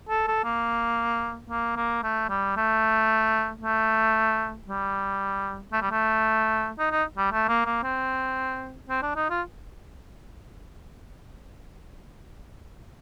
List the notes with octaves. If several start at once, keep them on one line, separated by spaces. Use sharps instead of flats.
A4
A4
A#3
A#3
A#3
A3
G3
A3
A3
G3
A3
G3
A3
D#4
D#4
G3
A3
A#3
A#3
C4
C4
D4
D#4
F4